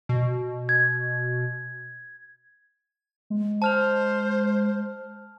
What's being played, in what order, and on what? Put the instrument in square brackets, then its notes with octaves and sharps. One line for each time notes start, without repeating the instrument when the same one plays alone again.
[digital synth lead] B2
[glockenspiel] G#6
[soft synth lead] G#3
[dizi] C5 [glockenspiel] A5 F6 F7